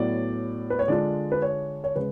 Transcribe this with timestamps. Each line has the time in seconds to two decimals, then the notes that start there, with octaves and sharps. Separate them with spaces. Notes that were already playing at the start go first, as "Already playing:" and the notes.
Already playing: A2 F#3 B3 D5
0.70 B4
0.79 C#5
0.88 D3 G#3 D4 F4 D5
1.32 B4
1.42 C#5
1.84 C#5
1.96 C#3 G#3 B4